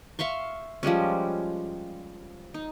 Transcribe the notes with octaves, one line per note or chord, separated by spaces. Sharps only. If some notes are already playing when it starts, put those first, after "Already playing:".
E5 F5 C6 C#6
F3 G3 G#3 C#4
D#4